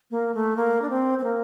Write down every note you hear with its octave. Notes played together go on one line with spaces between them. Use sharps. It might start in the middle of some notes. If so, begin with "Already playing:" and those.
A#3
A3
A#3
D4
C4
C4
A#3